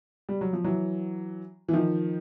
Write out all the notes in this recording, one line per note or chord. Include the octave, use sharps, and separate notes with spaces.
G3
F#3
F3
E3 F#3
E3
D#3 F3